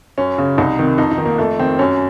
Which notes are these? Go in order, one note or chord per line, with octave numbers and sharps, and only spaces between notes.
F#2 C#4
C#3
C2 D#4
C3 D#3
F2 D#4
D#4
D#3
A#3
F2 A3
D#3 C4
F#2 C#4